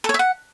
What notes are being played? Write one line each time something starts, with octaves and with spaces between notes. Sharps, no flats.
A4
C#5
E5
F#5